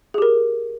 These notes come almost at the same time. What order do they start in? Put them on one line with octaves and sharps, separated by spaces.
G#4 G4 A#4